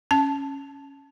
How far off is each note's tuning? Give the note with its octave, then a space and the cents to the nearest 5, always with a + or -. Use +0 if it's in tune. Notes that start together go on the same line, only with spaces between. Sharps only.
C#4 +0 A5 +0